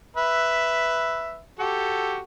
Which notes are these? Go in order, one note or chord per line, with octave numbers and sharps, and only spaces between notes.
B4 E5
F#4 G4 A4